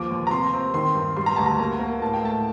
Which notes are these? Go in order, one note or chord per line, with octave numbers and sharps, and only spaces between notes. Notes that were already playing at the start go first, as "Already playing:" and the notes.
Already playing: D#2 F3 D6
D#2
A#5
C3 C6
C4
D#3 C6
G2
G3 C6
A#5
D2 A5
A#5
A#3
A#3
A2 A5
G5
A3 A5